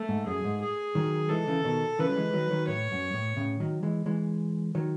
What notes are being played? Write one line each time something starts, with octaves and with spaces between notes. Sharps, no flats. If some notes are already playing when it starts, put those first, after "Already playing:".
Already playing: A3
G#2
F#2 G#4
G#2
G#4
D#3 F#3
E3 G#3 A4
C#3 E3
B2 D#3
C#3 E3 B4
F#3
E3 G#3
D#3 F#3
D#3 F#3
A2 C#5
F#2
A2
A2 C#3
D#3 F#3
E3 G#3
E3 G#3
D#3 F#3